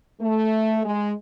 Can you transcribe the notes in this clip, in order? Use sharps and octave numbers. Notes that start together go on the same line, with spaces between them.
A3
G#3